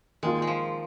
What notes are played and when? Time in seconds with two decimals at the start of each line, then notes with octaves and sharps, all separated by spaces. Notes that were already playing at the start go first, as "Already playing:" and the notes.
0.23 D#3 G#3 A#3 F4
0.42 G#3
0.47 F3